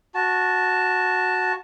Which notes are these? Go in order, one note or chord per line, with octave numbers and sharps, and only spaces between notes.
F#4 A5